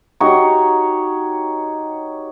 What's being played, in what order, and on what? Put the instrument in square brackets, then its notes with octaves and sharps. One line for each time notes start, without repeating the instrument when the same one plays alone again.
[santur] D#4 F#4 G4 C#5